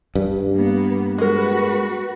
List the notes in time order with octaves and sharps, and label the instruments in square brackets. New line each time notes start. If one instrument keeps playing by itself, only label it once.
[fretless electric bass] G2
[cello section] A#3 B3
[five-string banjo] G#3 A#4 [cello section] F#4 B4